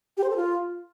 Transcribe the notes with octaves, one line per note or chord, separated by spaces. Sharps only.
G4
C5
A4
F4